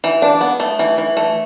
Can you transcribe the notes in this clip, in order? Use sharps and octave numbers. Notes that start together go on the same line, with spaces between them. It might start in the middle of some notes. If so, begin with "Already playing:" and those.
E3
D4
B3
A3
E3
E3
A3